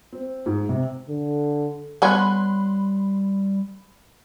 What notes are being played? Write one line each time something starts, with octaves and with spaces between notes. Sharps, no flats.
C4
G#2
C3
D3
G3 B3 C#4 B5 C6 F#6